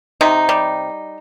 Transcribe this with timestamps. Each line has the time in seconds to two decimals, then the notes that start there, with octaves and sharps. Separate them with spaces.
0.21 C3 D#4
0.49 G3